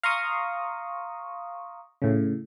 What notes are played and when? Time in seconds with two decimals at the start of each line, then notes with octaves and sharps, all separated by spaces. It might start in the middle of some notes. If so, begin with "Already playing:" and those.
0.03 F5 A#5 C6 C#6 D#6
2.02 A2 C#3